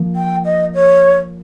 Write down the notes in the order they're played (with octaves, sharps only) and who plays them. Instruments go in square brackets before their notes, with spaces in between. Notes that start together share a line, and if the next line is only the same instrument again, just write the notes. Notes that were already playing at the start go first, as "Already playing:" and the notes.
Already playing: [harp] F3 A#3
[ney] G5
D#5
C#5